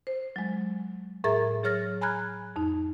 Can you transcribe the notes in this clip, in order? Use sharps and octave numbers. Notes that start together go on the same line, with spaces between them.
C5
F#3 G#3
A2 G#4 A#4 E5 A#5 A6
F#3 G#4 C#5 F6 A6 A#6
G#5 A#5 B5 F6 F#6 G#6
F2 D#4